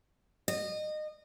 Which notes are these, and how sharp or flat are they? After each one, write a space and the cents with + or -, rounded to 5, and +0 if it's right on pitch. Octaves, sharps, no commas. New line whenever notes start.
D#5 -25